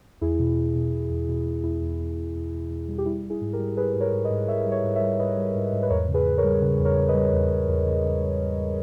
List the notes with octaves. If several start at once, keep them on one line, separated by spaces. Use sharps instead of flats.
E2 E4 G#4
B2
E2
B2
B2
E2
B2
B2
E2 E4
E2
E2
E2
E2
E2
E2
G3
G4
G3 E4
G3
E4 G#4
G#2
G4 A#4
G3
G3 G#4 B4
G#2
A#4 C#5
G#2
B4 D#5
G#2
G#2 C#5 E5
G3
C#5 E5
G#2
C#5 E5
G3
G#2 B4 D#5
G3
G#2
G#2
B4
E2 A#4 C#5
C#3
G#4 B4
E2
A#4 C#5
G3
C#3
E2
A#4 C#5
C#3
B4 D#5
G3
E2
E2
E2
C#3
C#3
C#3
E2
E2